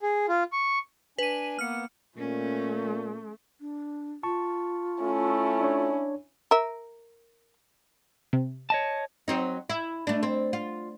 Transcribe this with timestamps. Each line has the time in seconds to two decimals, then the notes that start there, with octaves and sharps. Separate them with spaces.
0.03 G#4
0.29 F4
0.53 C#6
1.18 D4 B4 G#5 D#7
1.59 A#3 B3 F6 C#7
2.18 A#2 A3 C#4
3.61 D4
4.23 F4 A5 C#6
5.01 A3 C#4 E4
5.61 D4 C#5
6.51 A#4 E5
8.33 C3
8.70 C#5 D#5 A5
9.28 F#3 C4 D#4
9.70 E4
10.07 A3 D4
10.23 C4
10.53 F4